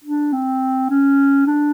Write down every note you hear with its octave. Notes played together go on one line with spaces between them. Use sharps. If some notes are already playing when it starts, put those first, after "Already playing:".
D4
C4
C#4
D4